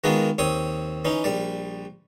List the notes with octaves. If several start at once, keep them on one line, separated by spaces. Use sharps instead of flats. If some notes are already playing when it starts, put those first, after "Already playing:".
D#3 G#3 A#3 B3 F4 F#4
D#2 C4 C#5 D#6
E3 C#4 D#4
A#1 G3 D5